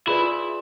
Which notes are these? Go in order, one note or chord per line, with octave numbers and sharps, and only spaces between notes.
E4 F4 G#4 B4 D5